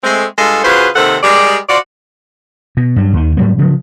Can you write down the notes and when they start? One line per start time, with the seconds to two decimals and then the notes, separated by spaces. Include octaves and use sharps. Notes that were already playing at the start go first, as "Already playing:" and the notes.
0.04 G#3 A3 C4
0.38 G2 G#3 F4 A4
0.64 C#3 F4 F#4 G#4 B4 C5
0.96 D#2 C3 D#3 C4 A4 F#5
1.23 G3 G#3 G4 G#4 A#4 D5
1.69 F4 F#4 C5 D5
2.77 B2
2.96 G2 F#3
3.13 D#2 D#3
3.37 G#2 F#3 G3 A#3
3.58 C#3 F3 F#3